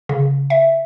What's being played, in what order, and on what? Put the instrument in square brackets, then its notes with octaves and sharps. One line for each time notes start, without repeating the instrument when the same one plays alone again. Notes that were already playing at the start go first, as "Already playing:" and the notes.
[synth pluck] C#3
E5